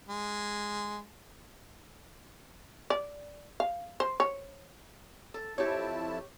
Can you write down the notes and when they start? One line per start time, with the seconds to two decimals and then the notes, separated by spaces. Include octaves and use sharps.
0.08 G#3
2.90 D5
3.60 F5
4.00 C5
4.20 C#5
5.34 A4
5.58 F2 E4 G4 C#5 A5